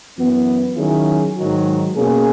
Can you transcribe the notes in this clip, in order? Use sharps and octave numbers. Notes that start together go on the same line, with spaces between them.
F#2 E3 B3
D#3 F#3 C#4 E4 G#4
G#2 D#3 F#3
B2 A#3 C#4 G#4